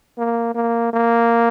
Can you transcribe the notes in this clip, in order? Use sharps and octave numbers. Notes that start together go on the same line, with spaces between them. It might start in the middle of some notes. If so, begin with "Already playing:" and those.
A#3
A#3
A#3